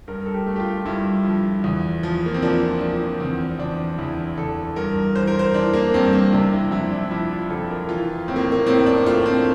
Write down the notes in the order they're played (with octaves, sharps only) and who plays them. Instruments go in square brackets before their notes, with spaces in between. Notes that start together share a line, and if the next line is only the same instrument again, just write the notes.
[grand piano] G2 A#4
A4
G4
A3
G4
F4
G2 E4
F3
E2
F3
A#3
C4
F3 D4
F3 D4
E2 C4
E2 D4
E2 E4
E2 A4
G2 A#4
E3 C5
A#4
C5
E3 D4
A#3
G2 C4
A#3
C3 D4
E4
F2 E4
D4
F3 E4
F4
F2 A4
A#4
E3 F4
A2 C4
A#3
A#3
A2 C4
D4
A3 F4
C4